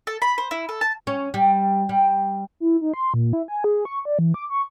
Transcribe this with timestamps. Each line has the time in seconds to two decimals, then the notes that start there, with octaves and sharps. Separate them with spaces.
0.07 A4
0.22 B5
0.38 C5
0.51 E4
0.69 A4
0.81 A5
1.07 C#4
1.34 G3
1.89 G3
2.60 E4
2.81 D#4
2.94 C6
3.14 A#2
3.33 E4
3.48 G#5
3.64 G#4
3.85 C#6
4.05 D5
4.19 E3
4.34 D6
4.50 C#6